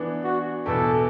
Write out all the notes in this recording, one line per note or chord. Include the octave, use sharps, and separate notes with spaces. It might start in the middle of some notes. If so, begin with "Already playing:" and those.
Already playing: E3 B3 D4
F#4
E2 B2 B3 A4